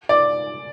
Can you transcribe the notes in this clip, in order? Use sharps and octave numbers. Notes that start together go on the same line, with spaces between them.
D5